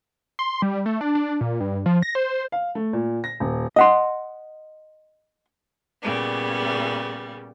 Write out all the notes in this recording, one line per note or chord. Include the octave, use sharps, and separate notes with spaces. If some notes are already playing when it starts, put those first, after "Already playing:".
C6
G3
A3
D4
D4
A#2
G2
F3
A#6
C5
F5
A3
A#2
A#6
D#1
D#5 F#5 C6
A#2 C#3 G3 B3